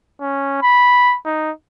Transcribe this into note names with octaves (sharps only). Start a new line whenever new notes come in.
C#4
B5
D#4